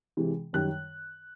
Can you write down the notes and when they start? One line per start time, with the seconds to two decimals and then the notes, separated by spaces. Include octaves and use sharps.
0.17 C3 E3 G#3
0.53 F#2 D#3 G3 F#6